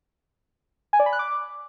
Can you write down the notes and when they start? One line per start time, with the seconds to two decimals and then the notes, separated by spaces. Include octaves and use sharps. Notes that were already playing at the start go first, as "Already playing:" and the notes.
0.93 G#5
1.00 D5
1.06 B5
1.13 F#6
1.19 D6